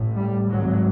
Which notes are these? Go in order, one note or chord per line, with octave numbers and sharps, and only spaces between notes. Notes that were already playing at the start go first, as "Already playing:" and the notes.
Already playing: A1 A2
G3
G#1 G#2 F#3